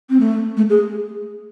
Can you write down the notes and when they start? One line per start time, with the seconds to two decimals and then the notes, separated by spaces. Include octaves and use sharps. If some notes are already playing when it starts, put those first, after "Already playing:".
0.10 C4
0.20 A3
0.57 A3
0.70 G#4